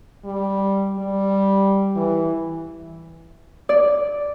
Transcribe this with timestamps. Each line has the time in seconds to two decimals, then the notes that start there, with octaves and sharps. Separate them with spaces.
0.25 G3
0.99 G3
1.96 E3
3.69 D5